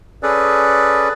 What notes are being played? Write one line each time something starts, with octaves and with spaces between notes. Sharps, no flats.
C#4 G#4 A4 B4 D5